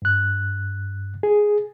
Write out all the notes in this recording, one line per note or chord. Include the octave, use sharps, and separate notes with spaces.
G2 F#6
G#4